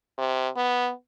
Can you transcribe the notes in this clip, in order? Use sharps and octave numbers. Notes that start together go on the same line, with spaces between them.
C3
B3